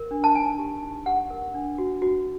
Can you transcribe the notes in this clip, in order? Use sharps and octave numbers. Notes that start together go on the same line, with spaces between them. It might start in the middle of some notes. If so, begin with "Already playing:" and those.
Already playing: A#4
D4
A5
D#4 G#5
G4
D#4
G4 F#5
A#4
D4
F#4
F#4